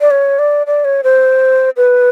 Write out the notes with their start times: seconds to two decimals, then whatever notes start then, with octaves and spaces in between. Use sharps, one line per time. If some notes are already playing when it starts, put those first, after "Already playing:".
0.01 D5
0.11 C#5
0.39 D5
0.67 D5
0.85 C#5
1.04 C5
1.77 B4